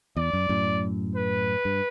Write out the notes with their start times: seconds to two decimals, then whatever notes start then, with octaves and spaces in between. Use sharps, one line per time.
0.16 E2 D5
0.33 F#2
0.49 F#2 A2
1.16 B4
1.65 G2